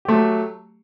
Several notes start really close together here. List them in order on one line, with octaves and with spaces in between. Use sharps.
G4 A3 F#3